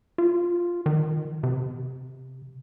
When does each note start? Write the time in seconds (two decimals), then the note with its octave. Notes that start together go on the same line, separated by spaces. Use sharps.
0.18 F4
0.86 D#3
1.43 C3